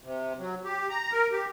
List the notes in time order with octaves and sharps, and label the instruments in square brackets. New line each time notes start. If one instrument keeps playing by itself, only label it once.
[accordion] C3
F#3
G4
A#5
A#4
G4